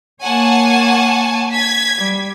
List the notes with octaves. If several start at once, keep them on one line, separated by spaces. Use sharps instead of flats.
A#3 C#5 F#5 G#5 A5
G#6 B6
G3